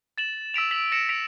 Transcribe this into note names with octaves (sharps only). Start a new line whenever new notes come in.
A6 E7 F#7
E6 B6 D7 F7
E6 B6 F7 F#7
A#6 C#7 D7 E7
B6 D7 F7